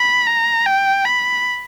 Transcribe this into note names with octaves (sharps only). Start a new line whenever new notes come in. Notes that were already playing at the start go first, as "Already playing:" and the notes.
Already playing: B5
A#5
G5
B5